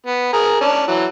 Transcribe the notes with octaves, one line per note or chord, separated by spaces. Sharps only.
B3
G#4 A#4
C#4 D5 A5
E3 F#3